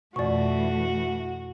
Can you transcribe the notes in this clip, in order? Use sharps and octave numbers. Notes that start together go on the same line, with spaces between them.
F2 B2 E3 A3 F#4 D5 C#6